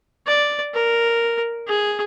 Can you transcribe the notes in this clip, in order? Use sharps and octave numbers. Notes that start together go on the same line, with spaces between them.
D5
A#4
G#4